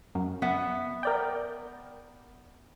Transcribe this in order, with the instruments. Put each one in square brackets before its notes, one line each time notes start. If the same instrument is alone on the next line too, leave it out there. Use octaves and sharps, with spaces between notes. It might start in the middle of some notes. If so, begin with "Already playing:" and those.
[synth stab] F#2
[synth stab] F#2 [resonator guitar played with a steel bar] B3 E5 F#5
[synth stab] A#4 D5 G5